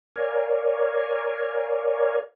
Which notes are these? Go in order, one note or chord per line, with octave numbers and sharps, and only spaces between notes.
A#4 C#5 D5 F5 G#5